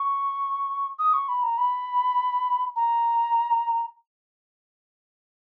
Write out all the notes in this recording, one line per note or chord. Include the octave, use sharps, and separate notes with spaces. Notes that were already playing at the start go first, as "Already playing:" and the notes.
Already playing: C#6
D#6
C#6
B5
A#5
B5
A#5